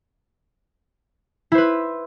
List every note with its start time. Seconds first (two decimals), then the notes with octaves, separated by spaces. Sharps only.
1.52 E4
1.55 C5
1.58 B4